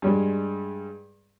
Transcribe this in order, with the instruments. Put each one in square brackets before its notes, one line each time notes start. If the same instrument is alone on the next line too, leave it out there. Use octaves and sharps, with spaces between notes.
[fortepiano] G2 G3 G#3